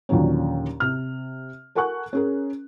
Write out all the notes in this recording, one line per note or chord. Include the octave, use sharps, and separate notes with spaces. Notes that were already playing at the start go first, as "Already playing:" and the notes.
D#2 A#2 D3 F3 F#3 C#4
C3 F6
A4 A#4 F#5 G#5 C#6 F#6
C#4 G#4 A#4